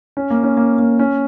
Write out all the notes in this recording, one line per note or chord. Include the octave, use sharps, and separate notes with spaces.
C#4
A#3
C#4
A#3
A#3
C#4